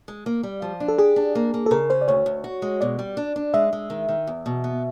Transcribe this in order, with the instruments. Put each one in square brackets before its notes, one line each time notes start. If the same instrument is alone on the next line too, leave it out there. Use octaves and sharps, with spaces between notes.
[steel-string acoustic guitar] G#3
A#3
G3
F3
D4
[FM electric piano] A4
[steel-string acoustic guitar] G4 [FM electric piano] G#4
[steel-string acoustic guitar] D4
A#3
A#3
[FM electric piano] A4
[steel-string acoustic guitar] C#3 [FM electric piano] A#4
[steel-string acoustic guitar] C#4 [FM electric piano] C5
[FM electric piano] D5
[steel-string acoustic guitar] D2 [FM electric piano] C#5
[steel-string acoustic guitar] D2
F#4
G#3
[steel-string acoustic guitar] B2 [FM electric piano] D5
[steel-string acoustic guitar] G3
D4
D4
[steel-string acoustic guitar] G#3 [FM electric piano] E5
[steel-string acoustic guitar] G#3
D#3
D#3
E2
B2
B3